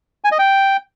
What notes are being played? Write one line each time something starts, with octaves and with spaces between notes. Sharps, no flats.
G#5
D#5
G5